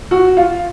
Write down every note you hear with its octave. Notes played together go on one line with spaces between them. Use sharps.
F#4
F4